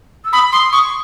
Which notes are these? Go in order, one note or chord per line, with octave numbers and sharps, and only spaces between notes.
E6
B5 D#6
C6 D#6
C#6 D#6